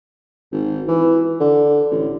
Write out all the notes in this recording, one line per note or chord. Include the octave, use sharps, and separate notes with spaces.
G#1
E3
D3
A1